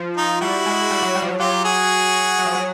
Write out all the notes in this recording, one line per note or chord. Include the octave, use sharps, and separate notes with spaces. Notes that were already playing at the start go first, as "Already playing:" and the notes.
Already playing: F3
D#4 F4
G3 E4 F#4
G#3
G3
F#3
G3
F3
F#3
F#3 F4 G4
F#4 G#4
F#3
F3
F#3